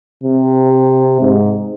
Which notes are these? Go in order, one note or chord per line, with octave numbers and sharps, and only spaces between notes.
C3
G#2